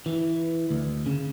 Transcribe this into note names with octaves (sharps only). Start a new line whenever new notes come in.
E3
D2
C#3